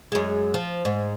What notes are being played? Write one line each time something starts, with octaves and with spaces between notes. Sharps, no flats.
F#2 G#3
F3
G#2